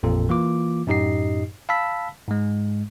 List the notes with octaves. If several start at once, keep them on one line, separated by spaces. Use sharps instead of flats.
A1 F2 A#2 A4
E3 A#3 F4 D6
F#2 A2 D#4 G4 D#5 C7
F5 A5 B5 E6 B6
G#2 G#3